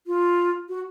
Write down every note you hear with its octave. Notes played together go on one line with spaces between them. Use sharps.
F4
F#4